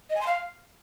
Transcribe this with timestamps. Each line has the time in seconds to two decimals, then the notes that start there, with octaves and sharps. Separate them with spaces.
0.10 D#5
0.15 G#5
0.21 C6
0.27 F5